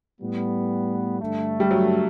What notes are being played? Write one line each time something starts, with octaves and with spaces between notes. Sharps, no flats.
A2 G3 B3
G2 D3 A3
G3
F#3